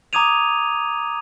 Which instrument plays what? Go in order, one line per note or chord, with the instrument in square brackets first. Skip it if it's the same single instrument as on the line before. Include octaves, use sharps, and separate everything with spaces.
[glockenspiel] A#5 D6 D#6 G#6 D#7 F7